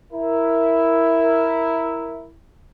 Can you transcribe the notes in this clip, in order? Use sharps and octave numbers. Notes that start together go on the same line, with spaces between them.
E4 A#4